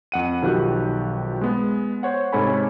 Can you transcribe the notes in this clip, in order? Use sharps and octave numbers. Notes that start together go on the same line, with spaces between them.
F2 F#5 D#7
B1 D#3 F3 F#4 G4 F#6
G#3 B3
C5 C#5 F#5
G#2 C3 A4 C#5 G#5 B5